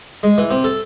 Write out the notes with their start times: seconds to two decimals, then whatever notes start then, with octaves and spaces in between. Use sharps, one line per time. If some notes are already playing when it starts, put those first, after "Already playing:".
0.23 G#3
0.38 E3
0.50 C3
0.64 A4